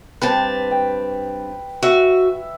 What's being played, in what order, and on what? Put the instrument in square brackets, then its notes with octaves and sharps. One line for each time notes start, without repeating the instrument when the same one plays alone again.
[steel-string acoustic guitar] G2 C4 A5 [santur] B4
[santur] G5
[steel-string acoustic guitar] F#4 [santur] E5